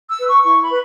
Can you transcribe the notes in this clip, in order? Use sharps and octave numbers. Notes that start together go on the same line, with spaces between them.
E6
B4
C#6
E4 C#6
B5
B4